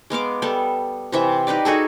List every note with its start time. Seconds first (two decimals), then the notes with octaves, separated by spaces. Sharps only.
0.10 G#3 B3 F5 D6
0.42 G3 B3 A4
1.12 C3 E3 E5
1.47 D#4 G4 B4 D5
1.65 D#4 F#4 G#4 A4